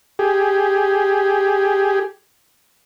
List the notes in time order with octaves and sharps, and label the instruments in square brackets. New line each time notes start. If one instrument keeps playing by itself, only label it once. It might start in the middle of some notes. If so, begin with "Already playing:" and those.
[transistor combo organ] G4 G#4